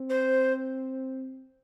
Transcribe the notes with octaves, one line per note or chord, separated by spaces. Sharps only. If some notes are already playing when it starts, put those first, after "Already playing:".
Already playing: C4
C5